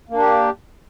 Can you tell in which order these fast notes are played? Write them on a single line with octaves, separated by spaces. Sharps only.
A#3 D4 G4